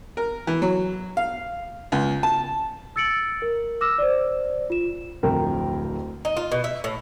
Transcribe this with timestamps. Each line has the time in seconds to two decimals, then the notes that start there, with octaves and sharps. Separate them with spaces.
0.17 A#4
0.47 E3
0.62 F#3
1.17 F5
1.92 C#2
2.23 A5
2.96 E6 A6 C#7 D7 F#7
3.42 A#4
3.81 D6 E6 F6 A#6 E7
3.98 C5 D5
4.70 F4 E7
5.23 D1 F2 A#4 G5
6.25 D#4
6.37 F4
6.52 B2
6.64 E5
6.84 A2